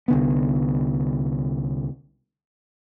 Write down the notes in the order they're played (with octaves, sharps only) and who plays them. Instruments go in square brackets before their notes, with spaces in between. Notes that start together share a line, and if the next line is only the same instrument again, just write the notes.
[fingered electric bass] C2 D3 B3